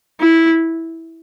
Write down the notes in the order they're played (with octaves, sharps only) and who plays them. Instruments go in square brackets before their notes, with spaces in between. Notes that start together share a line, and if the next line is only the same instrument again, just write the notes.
[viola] E4